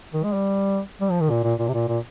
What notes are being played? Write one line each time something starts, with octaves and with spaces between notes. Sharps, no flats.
D#3
G#3
G3
G3
F3
D#3
A#2
A#2
A#2
C3
A#2
A#2